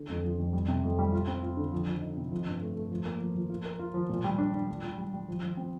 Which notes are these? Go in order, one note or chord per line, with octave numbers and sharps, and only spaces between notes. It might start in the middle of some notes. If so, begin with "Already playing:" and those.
Already playing: D3
F2
F3
F2
G3
C3
F2
G3
F4
C4
F4
D3
F3
F3
D#4
C3
F3
G2
A3
A3
F3
A#3
F3
F3
F4
A#4
F4
F3
A#2
G3
D4
D4
G3
F4
G3
G3
F3
F3
C4